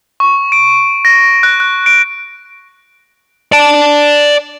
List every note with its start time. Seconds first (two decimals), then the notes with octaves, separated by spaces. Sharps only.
0.20 C#6
0.52 D7
1.05 A#6
1.43 F#6
1.60 F#6
1.86 D7
3.52 D5 A5